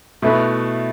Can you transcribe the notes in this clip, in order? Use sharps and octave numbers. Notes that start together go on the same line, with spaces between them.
B2 A3 E4 B4